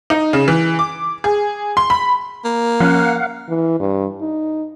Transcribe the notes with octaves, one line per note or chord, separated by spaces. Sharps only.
D#4
C#3
E3
D6
G#4
C6
B5
A#3
F3 C#4 F5 F#5
E3
G2
D#4